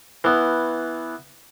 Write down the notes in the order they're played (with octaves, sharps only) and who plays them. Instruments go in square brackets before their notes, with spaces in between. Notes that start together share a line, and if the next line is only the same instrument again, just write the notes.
[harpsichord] E3 B3